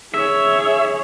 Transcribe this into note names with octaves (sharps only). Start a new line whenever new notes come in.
G#4 C#5 E5